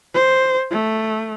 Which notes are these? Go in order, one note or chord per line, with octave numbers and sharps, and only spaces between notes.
C5
A3